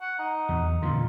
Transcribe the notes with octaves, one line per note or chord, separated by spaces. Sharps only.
F#5
D#4
E2
G2 A#2 D3 F4